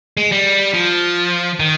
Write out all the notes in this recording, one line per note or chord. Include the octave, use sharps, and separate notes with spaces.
G#3
G3
F3
D#3